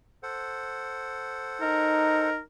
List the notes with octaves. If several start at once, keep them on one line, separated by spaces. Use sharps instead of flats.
A4 C5 F#5
D#4 A#4